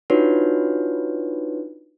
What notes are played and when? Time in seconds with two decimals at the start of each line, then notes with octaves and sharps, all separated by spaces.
0.10 D4 D#4 F4 F#4 B4 C#5